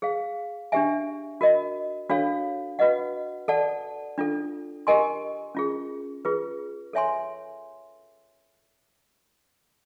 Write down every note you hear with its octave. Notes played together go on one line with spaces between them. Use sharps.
G#4 C5 F5
D4 G4 C5 E5 G#5
F#4 A#4 D#5
D4 F#4 A4 C#5 F5
F#4 B4 D#5 F#5
A4 D5 F#5 A5
D4 F4 A4
G4 A#4 D#5 G#5 C6
C#4 F4 G#4
F4 G#4 B4
A4 C#5 E5 G#5 C6